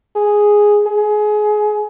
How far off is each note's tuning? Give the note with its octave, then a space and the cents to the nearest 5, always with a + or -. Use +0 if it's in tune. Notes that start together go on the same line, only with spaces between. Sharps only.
G#4 +0
G#4 +25